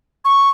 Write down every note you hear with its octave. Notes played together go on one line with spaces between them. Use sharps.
C#6